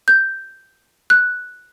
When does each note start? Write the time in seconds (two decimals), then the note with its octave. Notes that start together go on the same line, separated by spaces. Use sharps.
0.08 G6
1.10 F#6